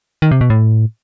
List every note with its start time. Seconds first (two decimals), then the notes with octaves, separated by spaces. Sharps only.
0.22 D#3
0.31 C3
0.41 B2
0.50 A2